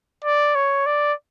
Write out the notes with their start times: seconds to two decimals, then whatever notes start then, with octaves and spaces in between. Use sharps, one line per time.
0.25 D5
0.55 C#5
0.87 D5